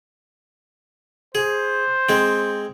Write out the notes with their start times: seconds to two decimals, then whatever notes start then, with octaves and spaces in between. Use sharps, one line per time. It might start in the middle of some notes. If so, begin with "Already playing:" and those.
1.35 G#4 C5
2.09 G#3 C4